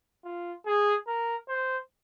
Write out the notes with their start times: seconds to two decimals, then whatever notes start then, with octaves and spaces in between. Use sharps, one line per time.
0.24 F4
0.66 G#4
1.07 A#4
1.48 C5